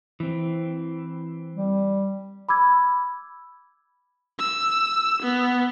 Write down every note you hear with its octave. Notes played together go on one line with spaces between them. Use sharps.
E3 C4
G3
B5 D6 E6 G#6
E6
B3